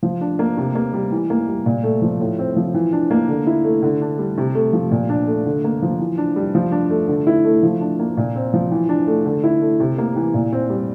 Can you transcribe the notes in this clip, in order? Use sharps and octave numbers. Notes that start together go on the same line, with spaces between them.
F3
D4
A#3
C3
A#3
G3
E3
A#3
G3
A#2
A3
F3
A2
C4
F3
E3
D4
A#3
D3
E4
A3
D3
D4
G3
C3
A3
F3
A#2
D4
A3
D3
A#3
F3
E3
D4
G3
F3
D4
A3
D3
E4
A3
F3
D4
A#3
A#2
C4
F3
E3
D4
A3
D3
E4
A3
C3
A#3
E3
A#2
C4
G3